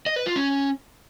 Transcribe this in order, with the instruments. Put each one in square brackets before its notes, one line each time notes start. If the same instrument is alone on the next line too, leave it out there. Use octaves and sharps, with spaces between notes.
[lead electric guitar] D#5
B4
F4
C#4